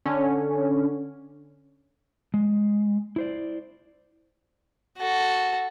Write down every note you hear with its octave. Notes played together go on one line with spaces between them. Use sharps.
D3 C#4
G#3
E4 C5 D5
F#4 A4